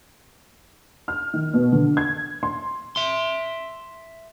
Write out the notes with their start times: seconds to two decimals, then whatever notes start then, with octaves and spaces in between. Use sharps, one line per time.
1.08 F6
1.34 D#3
1.54 B2
1.72 D3
1.97 G#6
2.43 C6
2.96 E5 C6